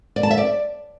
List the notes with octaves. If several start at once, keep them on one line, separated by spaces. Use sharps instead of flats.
D5
A5
E5
D5